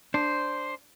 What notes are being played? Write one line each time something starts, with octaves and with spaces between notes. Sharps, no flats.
D4 C5